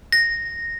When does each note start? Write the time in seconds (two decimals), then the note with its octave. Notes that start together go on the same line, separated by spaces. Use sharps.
0.12 A#6